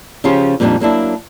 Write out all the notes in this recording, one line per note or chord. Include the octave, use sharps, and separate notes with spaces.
C#3 F3 C#4 F4 G4
F2 A#2 G3 B3 D4 D#4
F#3 A#3 D4 E4